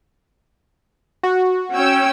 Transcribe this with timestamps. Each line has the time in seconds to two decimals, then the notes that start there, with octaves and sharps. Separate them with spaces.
1.23 F#4
1.73 C#4 G5 E6